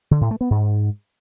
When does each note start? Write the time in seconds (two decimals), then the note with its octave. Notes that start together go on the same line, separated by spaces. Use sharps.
0.11 D3
0.21 A2
0.31 A3
0.41 B3
0.50 G#2